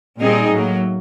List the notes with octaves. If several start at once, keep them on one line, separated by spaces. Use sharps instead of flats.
A#2 G3 C4 D#4 G#4
A2 F#3 A#3